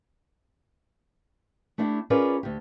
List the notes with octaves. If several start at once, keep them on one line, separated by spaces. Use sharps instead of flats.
A3 D4 E4 G4
C#4 F4 G#4 A#4 B4 D5
D2 G4